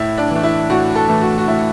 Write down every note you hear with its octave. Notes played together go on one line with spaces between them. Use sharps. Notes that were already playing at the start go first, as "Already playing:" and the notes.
Already playing: A2 E4
D4
E3
A3
E4
A2 F#4
A4
E3 A3
F#4
F#4
A2 E4